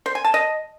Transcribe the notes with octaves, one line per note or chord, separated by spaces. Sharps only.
C5
G#5
A5
D#5